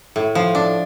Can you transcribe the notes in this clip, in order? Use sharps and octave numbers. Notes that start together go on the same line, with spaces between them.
A2
F3
D4